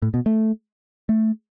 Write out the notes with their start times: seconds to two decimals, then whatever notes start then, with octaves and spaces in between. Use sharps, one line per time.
0.02 A2
0.14 B2
0.26 A3
1.09 A3